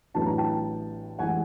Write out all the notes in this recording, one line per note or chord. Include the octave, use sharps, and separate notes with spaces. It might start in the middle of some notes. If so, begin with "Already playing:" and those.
A1 A2 F#3 B3 D4 A5
A#5
G5 A5
A1 E3 G#3 F#5 G#5